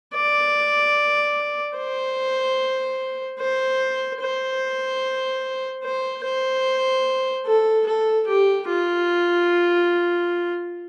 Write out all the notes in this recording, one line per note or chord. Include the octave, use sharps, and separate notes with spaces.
D5
C5
C5
C5
C5
C5
A4
A4
G4
F4